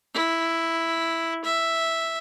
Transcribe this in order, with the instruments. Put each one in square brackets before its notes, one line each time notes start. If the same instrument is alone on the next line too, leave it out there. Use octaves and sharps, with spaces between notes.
[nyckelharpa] E4
E5